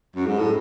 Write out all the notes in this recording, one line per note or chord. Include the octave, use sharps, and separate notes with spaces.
F#2
G#2
A2